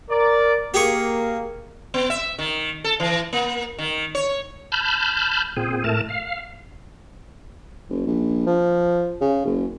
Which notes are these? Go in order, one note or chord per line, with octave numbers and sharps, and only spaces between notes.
A#4 D5
A#3 G4 G#4 C#6
B3
E5
D#3
A4
E3
A#3
D#3
C#5
A5 B5 F6 G6
A#2 C4 G#4
A2 A3 A#4 A5
F5
F#1
A#1
F3
C#3
F#1